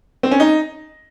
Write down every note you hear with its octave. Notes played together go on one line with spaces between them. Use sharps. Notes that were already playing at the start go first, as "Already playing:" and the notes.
C4
C#4
D#4